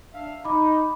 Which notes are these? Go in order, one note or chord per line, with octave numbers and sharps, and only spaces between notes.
D4 E5 F5
D#4 B5 D6